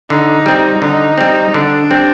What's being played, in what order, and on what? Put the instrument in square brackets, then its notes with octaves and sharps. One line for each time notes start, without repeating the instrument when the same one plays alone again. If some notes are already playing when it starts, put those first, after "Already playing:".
[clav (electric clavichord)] D3 [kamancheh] D#4
[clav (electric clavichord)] G3 C4
[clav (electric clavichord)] D3 [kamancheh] D#4
[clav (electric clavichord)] G3 C4
[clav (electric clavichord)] D3 [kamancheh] D4
[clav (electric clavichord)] G3 C4